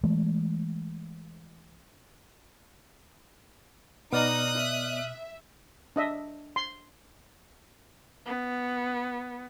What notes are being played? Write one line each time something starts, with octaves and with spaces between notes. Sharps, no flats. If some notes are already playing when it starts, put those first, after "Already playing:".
E3 G#3 A3
B2 B3 D#4 D5 D#5 D#6 F6 F#6
E5
D4 D#5 E5
C6
B3